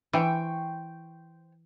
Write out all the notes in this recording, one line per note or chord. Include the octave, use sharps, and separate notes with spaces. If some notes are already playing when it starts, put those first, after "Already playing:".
E3 C5 G5 C#6